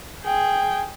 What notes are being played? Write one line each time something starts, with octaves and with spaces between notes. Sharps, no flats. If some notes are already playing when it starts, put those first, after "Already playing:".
G#4 G5